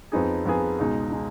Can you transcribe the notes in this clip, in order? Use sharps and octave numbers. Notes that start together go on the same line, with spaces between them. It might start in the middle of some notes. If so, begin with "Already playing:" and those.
F2 F3 B3 D#4 G#4
F2 F3 B3 D#4 G#4
C#2 B2 G#3 D#4
G#3 D#4